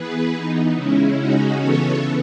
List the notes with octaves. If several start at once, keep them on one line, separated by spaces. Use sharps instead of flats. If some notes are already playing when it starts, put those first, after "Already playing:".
Already playing: E3 B3 G#4 B4
D#4
C#3 G#3 C#4 E4
D#4 F#4
C#3 E3 B3 A4 C#5